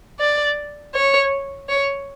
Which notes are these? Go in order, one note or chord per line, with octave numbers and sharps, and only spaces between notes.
D5
C#5
C#5